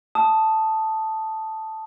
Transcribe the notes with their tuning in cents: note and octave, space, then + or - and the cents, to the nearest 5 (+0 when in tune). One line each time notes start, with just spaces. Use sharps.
A5 +0 D#6 +0